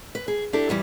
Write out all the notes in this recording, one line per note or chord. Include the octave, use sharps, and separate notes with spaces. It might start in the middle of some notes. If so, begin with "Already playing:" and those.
B4
G#4
D4 E4 G4 A4
G2 E3 G3 E4